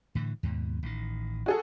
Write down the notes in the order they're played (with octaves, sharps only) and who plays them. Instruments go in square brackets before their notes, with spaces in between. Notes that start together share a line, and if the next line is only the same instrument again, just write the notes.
[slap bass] A2 D3 E3
D#2 G#2 B2
A1 D#3
[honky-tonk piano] F#4 G#4 A4